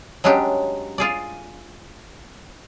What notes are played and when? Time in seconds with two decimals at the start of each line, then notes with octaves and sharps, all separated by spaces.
0.24 F#3 G#3 C#4 D4 G4
0.98 F4 G#4 D5